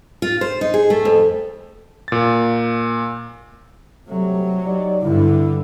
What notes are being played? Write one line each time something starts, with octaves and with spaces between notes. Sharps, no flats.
F4
C5
D#4
G#4
A3
F2
A#2 A6
C3 F#3 G3 A3
D#4 G4 D5
G2 D3 E4